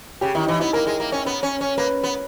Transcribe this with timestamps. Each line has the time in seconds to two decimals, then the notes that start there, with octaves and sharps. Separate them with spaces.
0.21 C#3 G4
0.35 D#3 E4
0.46 E3 D#4
0.60 B3 E4
0.73 A#3 A#4
0.87 G#3
1.00 A#3
1.12 C#4
1.26 B3
1.43 C#4
1.61 C#4
1.78 A#3 B4
2.04 B3